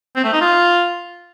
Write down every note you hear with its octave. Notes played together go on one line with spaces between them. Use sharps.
C4
A3
D#4
F4